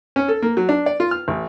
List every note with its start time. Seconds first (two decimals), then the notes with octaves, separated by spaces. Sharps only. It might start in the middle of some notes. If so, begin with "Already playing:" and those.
0.16 C#4
0.28 A4
0.42 A#3
0.57 F#3
0.69 D4
0.86 D5
1.00 F4
1.11 F6
1.28 A1